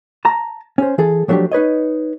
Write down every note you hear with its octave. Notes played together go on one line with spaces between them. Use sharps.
A5 A#5
C#4 C5
E3 G#4 A4
F3 F#3 A3 C4 D4 G4
D#4 B4 C#5 D#5